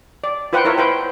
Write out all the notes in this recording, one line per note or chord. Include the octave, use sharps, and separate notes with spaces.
D5
F4 B4 C5 F#5 G5
E4 A#4 C#5 E5
B4 C5 G5